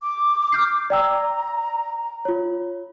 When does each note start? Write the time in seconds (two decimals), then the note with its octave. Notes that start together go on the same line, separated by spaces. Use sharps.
0.02 D6
0.52 F6 G6 C7
0.90 D5 G5 A#5 E6
2.25 F4 C#5